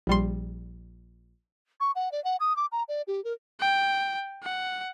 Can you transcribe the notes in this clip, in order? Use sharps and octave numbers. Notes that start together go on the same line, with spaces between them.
A#1 G3 C6
C#6
F#5
D5
F#5
D#6
D6
A#5
D5
G4
A#4
G5
F#5